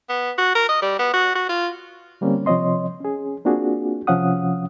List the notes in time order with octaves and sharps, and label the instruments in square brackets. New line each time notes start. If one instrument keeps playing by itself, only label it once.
[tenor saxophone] B3
F#4
A#4
D#5
G3
B3
F#4
F#4
F4
[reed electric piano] D3 G3 A#3 C4 C#4
C3 F3 C4 C#5 D#5 C6
C#4 G#4
A#3 C4 D4 F4 F#4 G#4
C3 F3 C#4 F5 F#5 D#6